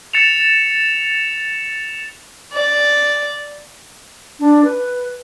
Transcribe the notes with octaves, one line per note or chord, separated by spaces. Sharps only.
A6 C#7 E7 F7
D5
D4
B4